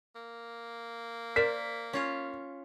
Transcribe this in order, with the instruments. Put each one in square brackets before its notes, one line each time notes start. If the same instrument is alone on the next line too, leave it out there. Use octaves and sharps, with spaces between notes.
[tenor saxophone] A#3
[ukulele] A#4 C5 D5 [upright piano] B6
[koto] C#4 F4 C#5